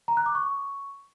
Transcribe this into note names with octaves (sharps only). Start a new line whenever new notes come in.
A#5
F#6
D6
C#6